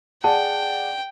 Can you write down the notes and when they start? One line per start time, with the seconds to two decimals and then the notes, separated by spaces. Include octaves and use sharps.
0.24 G#4 D5 F#5 G5 A5